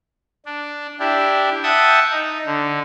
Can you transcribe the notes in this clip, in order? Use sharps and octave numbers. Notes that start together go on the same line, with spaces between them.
D4
D4 E4 G4
E5 F#5 G5 A5 D#6
D#4
D3